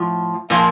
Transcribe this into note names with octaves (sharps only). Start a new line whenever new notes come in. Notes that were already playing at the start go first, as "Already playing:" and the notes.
Already playing: A2 F3
A#2 F3 A#3